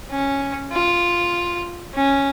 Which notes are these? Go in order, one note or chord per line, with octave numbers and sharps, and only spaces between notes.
C#4
F4
C#4